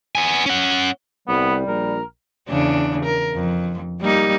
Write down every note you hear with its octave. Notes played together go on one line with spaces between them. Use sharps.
B3 G#5
C#4 F#5
C2 G3 B3
A#1 A#4
E2 C#3 D4
A#4
F2
G3 A#3 D#4